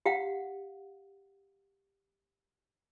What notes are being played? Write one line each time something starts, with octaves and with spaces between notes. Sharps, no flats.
G4 F5 F#5